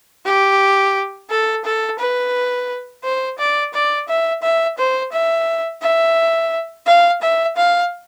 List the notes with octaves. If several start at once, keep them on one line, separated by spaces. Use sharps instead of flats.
G4
A4
A4
B4
C5
D5
D5
E5
E5
C5
E5
E5
F5
E5
F5